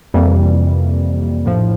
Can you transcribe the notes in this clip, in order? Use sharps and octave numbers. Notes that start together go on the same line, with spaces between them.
F2 C3 E3 G3 A#3
A#1 A2 F3